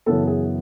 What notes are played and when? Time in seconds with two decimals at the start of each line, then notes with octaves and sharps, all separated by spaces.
0.06 F#2 C#3 E3 B3 A4
0.27 G#4